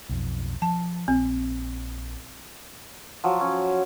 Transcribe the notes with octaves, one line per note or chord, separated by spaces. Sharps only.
B1 F2
F3 A5
A#1 C4
F3 F#3
C#4